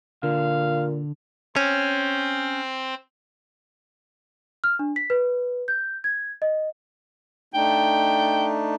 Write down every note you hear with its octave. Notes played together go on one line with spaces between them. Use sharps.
A#2 D3 F5
C4 C#4 C5
F6
D4
B6
B4
G6
G#6
D#5
A3 D4 D#4 G5